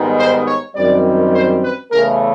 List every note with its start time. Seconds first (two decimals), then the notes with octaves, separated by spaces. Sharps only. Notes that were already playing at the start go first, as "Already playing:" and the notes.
Already playing: G#2 D#3 G3 B3
0.17 C5
0.46 C#5
0.75 F#2 D#3 G3 C4 D5
1.33 C5
1.62 B4
1.90 E2 C#3 E3 A3 A#4